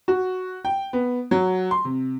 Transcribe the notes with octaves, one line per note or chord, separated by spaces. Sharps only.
F#4
G5
B3
F#3
C6
C3